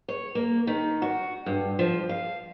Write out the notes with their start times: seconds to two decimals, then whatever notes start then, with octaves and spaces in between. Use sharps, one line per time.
0.08 C#5
0.35 A#3
0.67 D#3
1.02 F#4
1.46 G2
1.79 F3
2.09 F5